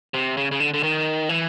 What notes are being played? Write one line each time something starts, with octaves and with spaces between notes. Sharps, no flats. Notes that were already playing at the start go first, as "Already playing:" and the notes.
C3
C#3
C#3
D3
D3
D#3
E3